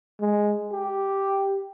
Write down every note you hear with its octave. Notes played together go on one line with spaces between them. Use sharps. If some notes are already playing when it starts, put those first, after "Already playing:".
G#3
G4